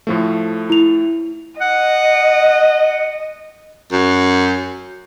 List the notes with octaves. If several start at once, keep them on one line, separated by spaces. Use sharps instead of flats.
A2 F3 A3
E4 F7
D#5 F#5
F#2